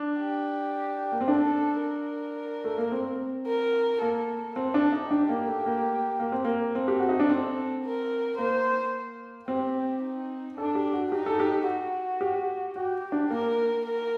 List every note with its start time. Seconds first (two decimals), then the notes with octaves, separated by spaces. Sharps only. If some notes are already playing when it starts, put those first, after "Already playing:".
Already playing: D4
0.19 G4
1.12 A#3
1.21 C4
1.28 D4 A4
1.82 A#4
2.64 A3
2.78 A#3
2.92 C4
3.47 A#4
4.02 A#3 A4
4.56 C4 A4
4.74 D4
4.92 D#4
5.11 D4 G4
5.29 A#3
5.47 A3
5.66 A#3
6.20 A#3
6.32 C4
6.45 A#3
6.75 C4 A4
6.88 G4
6.99 F#4
7.09 D#4
7.20 D4
7.29 C4
7.84 A#4
8.38 A#3 C5
9.48 C4 G4
10.03 D#4
10.57 D4 A4
10.75 G4
10.93 F#4
11.12 D#4 G4
11.26 A4
11.40 G4
11.67 F#4
12.21 G4
12.76 F#4 G4
13.12 D4
13.31 A#3 A#4
13.85 A#4